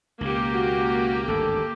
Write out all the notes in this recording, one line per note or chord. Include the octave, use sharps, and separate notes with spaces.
C#2 B2 A#3 G4
F#4
G#1 D2 G2 A4